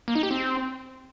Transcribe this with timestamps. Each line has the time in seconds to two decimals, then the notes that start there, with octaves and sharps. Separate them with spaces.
0.08 A#3
0.15 D#4
0.23 G4
0.31 C4